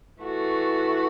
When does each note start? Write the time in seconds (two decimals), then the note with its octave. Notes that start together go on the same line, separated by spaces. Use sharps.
0.23 E3 A3 F#4